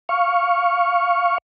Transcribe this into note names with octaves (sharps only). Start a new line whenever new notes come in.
F5 C#6